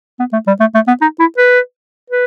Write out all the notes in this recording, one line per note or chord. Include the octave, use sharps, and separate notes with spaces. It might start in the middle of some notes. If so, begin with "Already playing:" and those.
B3
A3
G3
A3
A3
B3
D#4
E4
B4
B4